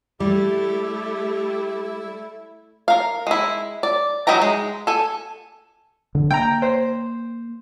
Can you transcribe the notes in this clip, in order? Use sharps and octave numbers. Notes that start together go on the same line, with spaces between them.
G3 A3 E4 G4
A#4 F5
G#3 E4
D5
F#3 D#4 E4 G5 A#5
G#3
A4 G#5
D3
A#3 G5 A#5
C5